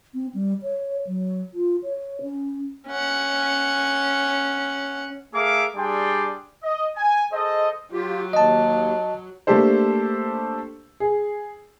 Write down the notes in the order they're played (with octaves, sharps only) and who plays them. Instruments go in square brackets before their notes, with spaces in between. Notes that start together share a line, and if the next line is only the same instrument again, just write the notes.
[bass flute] C4
G3
C#5
F#3
F4
C#5
C#4
[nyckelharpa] C#4 F#5
[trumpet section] A3 G#4 A#4 E5 F5 D6
G3 D4 G#4 D5 G5 C6
D#5
G#5
G#4 A4 C5 D#5
[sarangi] F#3 [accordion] F4 G4
[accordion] D#2 [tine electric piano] D#5 A5
[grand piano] A3 A#3 D4 G4 A4 C5
G#4